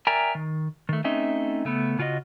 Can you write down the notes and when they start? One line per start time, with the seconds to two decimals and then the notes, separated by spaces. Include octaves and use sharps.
0.07 A#4 D5 E5 G5 G#5 A#5
0.35 D#3
0.89 D#3 A3
1.04 A3 C4 C#4 D#4 D#5 E5
1.65 C#3 A3 B3
1.99 C#3 F4 F#4 C#5 D#5